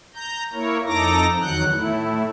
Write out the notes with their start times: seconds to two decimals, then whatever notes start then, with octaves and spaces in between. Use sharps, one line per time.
0.15 A#5 G6
0.53 A#3 E4 A#4 C#5
0.87 F2 D#4 A4 A#5 D6 A#6
1.41 E2 D#3 F#3 F#5 F#6 G6
1.71 A2 A3 E4